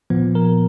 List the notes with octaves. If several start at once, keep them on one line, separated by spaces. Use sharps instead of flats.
A#2 F3 B3
A#4